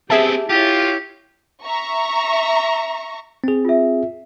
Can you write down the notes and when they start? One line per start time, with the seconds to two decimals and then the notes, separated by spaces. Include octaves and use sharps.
0.10 B3 C4 G4 G#4 E5 A5
0.49 E4 F4 G4 C#5
1.64 E5 A#5 C#6
3.44 C4 G#4
3.65 F4 E5